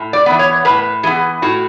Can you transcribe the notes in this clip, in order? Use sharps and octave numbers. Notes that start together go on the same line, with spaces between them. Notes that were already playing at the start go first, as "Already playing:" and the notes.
Already playing: A2
D5
E3 B3
C#5
A2 B4
E3 B3 G#4
A2 F#4